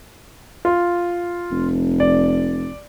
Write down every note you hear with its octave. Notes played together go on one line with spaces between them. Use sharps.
F4
F1
D5